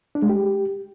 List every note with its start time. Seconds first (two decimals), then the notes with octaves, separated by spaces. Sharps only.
0.15 D4
0.22 G#3
0.29 G4